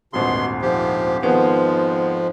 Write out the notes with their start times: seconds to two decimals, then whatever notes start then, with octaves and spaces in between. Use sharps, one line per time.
0.13 D#1 G#1 D2 B2 C6
0.62 G#2 F3 G4
1.22 F2 G#2 D#3 F3 B3 G#4